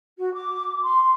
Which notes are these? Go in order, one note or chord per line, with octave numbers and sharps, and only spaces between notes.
F#4
D6
C6